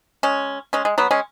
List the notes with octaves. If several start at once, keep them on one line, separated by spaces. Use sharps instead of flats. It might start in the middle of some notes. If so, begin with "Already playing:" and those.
G#3 C#4
G#3 C#4
G#3
F#3 B3
G#3 C#4